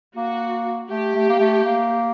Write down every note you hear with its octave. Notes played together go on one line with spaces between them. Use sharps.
A#3 F#4
A3 G4
A3
A#3
A3
A#3